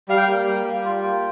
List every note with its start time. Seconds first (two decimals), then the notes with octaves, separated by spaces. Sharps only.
0.08 G3 F5
0.17 G5
0.27 A#3
0.46 G3
0.65 G3
0.85 F4
1.04 A#3